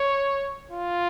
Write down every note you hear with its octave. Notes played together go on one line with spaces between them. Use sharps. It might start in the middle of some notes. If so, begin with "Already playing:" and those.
Already playing: C#5
F4